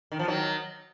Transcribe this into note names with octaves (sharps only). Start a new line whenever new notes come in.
D#3
F3
D#3 F#3